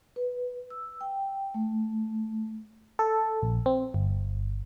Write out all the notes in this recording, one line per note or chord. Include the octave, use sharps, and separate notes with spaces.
B4
E6
G5
A3
A4
A#1
C4
G1